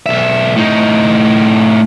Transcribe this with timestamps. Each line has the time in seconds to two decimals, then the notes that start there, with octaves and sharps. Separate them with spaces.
0.06 B1 E5
0.56 A2 D#4